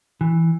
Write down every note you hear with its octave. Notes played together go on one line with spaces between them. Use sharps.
E3